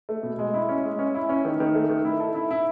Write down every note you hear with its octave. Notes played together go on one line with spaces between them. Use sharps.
A3
B2
G#3
E4
C#4
G#3
C#4
E4
C#4
D#3
D#3
A3
D#3
E4
A4
E4
E4